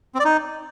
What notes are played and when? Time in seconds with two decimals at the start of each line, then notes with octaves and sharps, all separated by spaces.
0.15 C4
0.20 D5
0.25 D#4